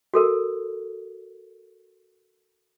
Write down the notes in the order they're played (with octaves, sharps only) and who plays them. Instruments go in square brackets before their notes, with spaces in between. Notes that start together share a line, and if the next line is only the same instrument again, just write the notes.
[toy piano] F#4 A4 A#4